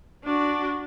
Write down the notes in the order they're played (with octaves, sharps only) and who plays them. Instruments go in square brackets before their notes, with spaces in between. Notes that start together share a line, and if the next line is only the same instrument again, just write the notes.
[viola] D4 F#4